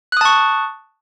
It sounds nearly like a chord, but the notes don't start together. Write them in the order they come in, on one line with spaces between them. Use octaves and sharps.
F#6 D#6 A5 C#6